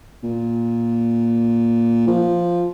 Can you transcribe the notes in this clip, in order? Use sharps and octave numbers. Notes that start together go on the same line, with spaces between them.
A#2
F3